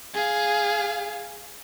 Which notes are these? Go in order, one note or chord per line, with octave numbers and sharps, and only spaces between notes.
G#4 F5